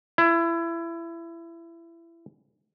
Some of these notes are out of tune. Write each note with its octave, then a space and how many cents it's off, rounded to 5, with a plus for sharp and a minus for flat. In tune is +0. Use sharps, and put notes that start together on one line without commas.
E4 +25